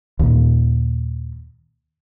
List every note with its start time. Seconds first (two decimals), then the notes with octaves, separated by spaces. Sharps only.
0.19 D#2 A#2